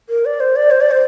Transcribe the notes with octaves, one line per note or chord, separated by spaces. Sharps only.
A#4
D5
C5
D5
C5
D5
C5